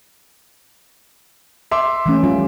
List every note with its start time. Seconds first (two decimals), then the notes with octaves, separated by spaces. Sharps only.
1.71 E5 C6 D6
2.06 E3 A3 C#4
2.23 F3 G3 F4